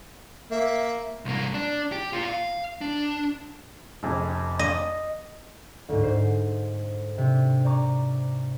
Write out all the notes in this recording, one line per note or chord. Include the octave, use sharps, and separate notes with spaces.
A#3 E5
C2 A#3
D4
G4
A#3 F4
F5
D4
F1 F2 C#3
D#5
D2 G#2
G#2 C5 C7
C3 D4
C5 D5 G#5 A#5 C#6 D6